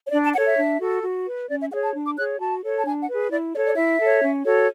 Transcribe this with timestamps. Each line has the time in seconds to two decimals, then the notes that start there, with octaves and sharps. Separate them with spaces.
0.06 C#5
0.12 D4 D5
0.24 A5
0.35 A4 C#5 F#5
0.46 E5
0.57 D4
0.80 F#4 A4
1.03 F#4
1.26 B4
1.48 C#4 D5
1.60 E5
1.71 G#4 C#5 F#5
1.83 A5
1.94 D4
2.05 D6
2.17 G#4 C#5 F#6
2.39 F#4 A5
2.62 A4 C#5
2.78 A5
2.85 D4 G#5
3.01 F#5
3.08 G#4 B4
3.31 E4 D5
3.54 A4 D5
3.57 C#5
3.65 D5
3.76 E4 E5
3.99 A4 C#5
4.22 C#4
4.45 F#4 A4 C#5